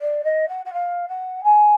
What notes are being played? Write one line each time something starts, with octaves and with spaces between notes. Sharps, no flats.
D5
D#5
F#5
F#5
F5
F#5
G#5